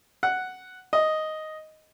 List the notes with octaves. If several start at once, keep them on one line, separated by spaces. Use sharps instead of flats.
F#5
D#5